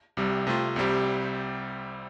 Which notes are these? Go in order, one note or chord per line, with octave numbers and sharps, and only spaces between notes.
C2 C3 G3
C3 A3 C4 F4
C2 C3 G3 C4 G4